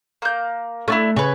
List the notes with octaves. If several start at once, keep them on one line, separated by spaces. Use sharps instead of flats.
A#3 G6
A3 C#4 D4 E4
C#3 B4 C#5